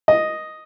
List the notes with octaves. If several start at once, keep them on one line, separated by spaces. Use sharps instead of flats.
D#5